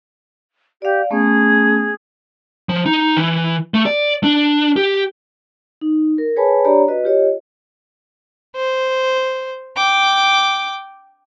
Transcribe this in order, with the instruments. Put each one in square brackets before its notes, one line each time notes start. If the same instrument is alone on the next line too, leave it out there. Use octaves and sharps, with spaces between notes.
[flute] G4 [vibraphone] D5 F5
[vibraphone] A3 B3 C#4 [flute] G#4
[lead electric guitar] F3
D#4
E3
A3
D5
D4
G4
[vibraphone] D#4
A#4
G#4 B4 C#5 G#5 A5 B5
D4 G4 C#5 D5 A#5 B5
F#4 B4 D#5
F4 G4 C#5 D#5
[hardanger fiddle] C5
G5 D6